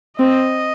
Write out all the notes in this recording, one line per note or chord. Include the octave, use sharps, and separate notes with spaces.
C4 D#5